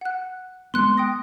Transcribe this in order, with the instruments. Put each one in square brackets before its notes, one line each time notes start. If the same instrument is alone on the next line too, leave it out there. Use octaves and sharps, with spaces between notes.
[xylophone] F#5 F#6
[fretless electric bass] G#3 B3 [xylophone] C6 F#6 C#7
[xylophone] G5 D#6 A#6